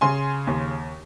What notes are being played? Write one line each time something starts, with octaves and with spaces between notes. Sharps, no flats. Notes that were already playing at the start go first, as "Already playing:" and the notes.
C#3 G#5 C6
D#2